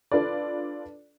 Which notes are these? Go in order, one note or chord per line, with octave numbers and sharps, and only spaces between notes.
D4 F4 A4 B4 D5